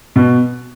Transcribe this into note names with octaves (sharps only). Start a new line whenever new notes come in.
B2